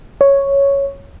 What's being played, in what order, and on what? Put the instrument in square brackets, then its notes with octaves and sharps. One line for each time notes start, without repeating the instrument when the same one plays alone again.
[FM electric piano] C#5